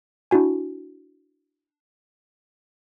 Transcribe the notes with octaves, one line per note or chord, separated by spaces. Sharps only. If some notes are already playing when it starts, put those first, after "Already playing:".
D4 E4 F#4 G#5